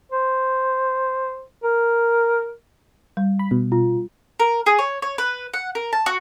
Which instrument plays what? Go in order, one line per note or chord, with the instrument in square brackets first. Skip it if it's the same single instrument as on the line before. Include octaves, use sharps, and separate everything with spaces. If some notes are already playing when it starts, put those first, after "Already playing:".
[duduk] C5
A#4
[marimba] G3
[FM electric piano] B5
B2
[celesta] F4
[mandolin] A#4
G#4
C#5
C#5
B4
F#5
A#4
A5
F#4